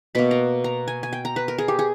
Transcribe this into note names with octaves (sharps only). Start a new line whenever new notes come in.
B2 A#3 B5
A#5
A#5
G#5
G#5
G5
A#5
B4
A#4
G#4
G4
G#4